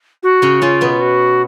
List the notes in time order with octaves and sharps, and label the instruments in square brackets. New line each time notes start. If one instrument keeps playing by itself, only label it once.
[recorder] F#4
[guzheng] C#3 C#4
[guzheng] C#3 C#4 [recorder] F4
[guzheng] B2 B3
[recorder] F#4